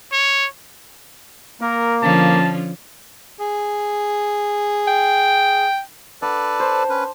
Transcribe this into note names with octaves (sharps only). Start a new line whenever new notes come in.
C#5
A#3 A#4
D3 F3 C#4 A5
G#4
G5
D4 A4 B4 D5 F#5
C5
C#4 B4